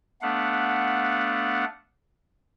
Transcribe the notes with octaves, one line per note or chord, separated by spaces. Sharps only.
A3 B3 D4 F5 F#5